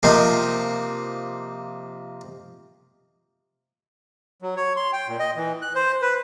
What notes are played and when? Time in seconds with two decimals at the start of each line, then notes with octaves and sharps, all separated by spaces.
0.03 C3 F3 A#3 D#4
4.42 F#3
4.56 C#5
4.76 C6
4.93 G5
5.08 A#2
5.19 D#5
5.36 E3
5.62 F#6
5.75 C5
6.02 B4